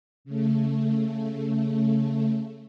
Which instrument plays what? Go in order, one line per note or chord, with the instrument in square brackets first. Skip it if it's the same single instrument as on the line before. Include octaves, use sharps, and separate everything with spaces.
[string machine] C#3 A3